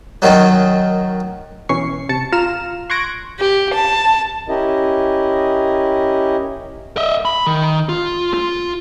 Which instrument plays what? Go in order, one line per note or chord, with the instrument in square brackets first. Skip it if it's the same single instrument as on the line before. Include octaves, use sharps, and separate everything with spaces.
[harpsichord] F#2 D#3 F#3
[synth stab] B2 E3 C#4 C#6 C7
C3 A5 C#7
F4 A#5 F6 E7
C6 C#6 F#6 G#6 A#6 D7
[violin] G4
A5
[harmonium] C#4 E4 G4 A#4 D#5
[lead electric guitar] D#5 E5
B5
D#3
F4
F4